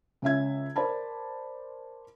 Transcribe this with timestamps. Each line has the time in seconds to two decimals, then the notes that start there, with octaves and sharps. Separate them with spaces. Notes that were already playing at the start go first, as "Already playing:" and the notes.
0.22 C#2 C#4 E5 G#6
0.76 A#4 C5 D5 A5 B5